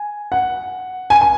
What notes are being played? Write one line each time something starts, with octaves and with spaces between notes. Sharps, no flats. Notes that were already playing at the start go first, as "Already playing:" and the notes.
Already playing: G#5
F#5
G#5
G#5